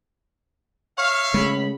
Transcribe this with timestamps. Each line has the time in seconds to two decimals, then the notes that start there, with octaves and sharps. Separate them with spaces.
0.99 C#5 E5 F5 F6
1.34 C#3 G#3 A3 B5